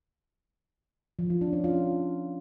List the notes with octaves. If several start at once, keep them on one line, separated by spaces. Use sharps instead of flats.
F3
F4
D4
C#4
F4